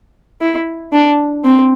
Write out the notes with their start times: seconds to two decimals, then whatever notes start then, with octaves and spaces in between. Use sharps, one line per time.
0.41 E4
0.93 D4
1.44 C4